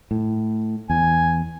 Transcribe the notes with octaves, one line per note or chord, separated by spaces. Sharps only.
A2
E2 G#5